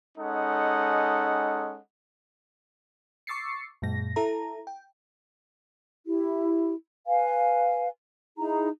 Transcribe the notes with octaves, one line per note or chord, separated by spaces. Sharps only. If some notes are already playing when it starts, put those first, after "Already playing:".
G#3 C#4 D#4 A4 D#5 F#5
C#6 D6 E6 A6 C7 C#7
F#2 A#2 G#3 A#6
E4 A4 A#5
G5
E4 G4
B4 F5 G#5
D#4 E4 G#4 A#5